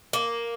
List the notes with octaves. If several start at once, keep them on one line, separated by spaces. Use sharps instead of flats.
A#3